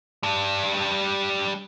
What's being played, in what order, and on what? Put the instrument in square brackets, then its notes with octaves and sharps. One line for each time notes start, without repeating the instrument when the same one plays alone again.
[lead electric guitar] G3 D4